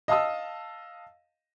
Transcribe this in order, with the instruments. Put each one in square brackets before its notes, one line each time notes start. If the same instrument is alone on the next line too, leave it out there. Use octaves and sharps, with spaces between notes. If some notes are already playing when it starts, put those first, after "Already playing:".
[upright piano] D#5 F5 A5 D#6 E6